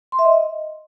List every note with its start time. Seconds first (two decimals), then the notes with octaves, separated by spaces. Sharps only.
0.12 C6
0.19 E5
0.25 D#5